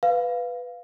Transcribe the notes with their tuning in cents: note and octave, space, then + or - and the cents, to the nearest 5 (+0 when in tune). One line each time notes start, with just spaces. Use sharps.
B4 +5 F5 +0